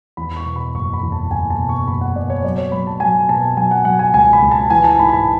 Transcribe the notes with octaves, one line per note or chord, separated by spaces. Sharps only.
E2 B5
C#6
B2
B5
F#1 C#6
B5
E2
A5
F#1 G#5
A5
B2
C#6
F#1 B5
F#5
B2 D5
C#5
F#3 D5
C#5
F#3 B5
A5
F#3 G#5
B2 A5
F#3 G#5
F#5
F#3 F#5
G#5
C#2 G#5
B5
C#2
A5
E3 G#5
A5
G#2 B5
B5
A5